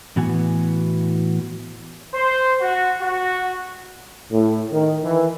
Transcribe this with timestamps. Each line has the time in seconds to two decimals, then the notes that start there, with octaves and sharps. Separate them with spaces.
0.16 A2 E3 B3 F#4 G#5
2.14 C5
2.62 F#4
3.01 F#4
4.31 A2
4.72 D#3
5.04 E3